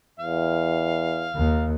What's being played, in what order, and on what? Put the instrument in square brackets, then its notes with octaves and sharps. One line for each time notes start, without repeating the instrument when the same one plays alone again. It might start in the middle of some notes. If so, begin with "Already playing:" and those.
[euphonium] E2 [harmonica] F5
[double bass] D#2